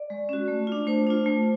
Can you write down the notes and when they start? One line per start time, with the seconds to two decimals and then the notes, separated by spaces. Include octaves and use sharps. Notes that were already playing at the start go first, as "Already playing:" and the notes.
Already playing: D5
0.10 G#3
0.29 C#4 F#4
0.48 A3
0.67 D4 F4
0.87 A3 C5
1.07 D4 F4
1.26 A3